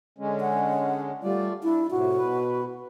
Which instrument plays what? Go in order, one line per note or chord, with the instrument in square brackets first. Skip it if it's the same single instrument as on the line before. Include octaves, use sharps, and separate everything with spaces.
[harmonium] D3 G#3 C#4
[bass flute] F#5
[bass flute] G3 [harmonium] A3 F4 D5
[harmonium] D4 [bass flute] E4
[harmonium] A2 C3 [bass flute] F#4
[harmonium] B2 B4